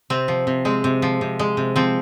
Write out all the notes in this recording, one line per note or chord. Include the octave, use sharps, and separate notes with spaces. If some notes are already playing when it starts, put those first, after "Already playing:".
C3 C4
F3
C3
G#3 C4
C3
F3
C3
G#3
C3
F3 C4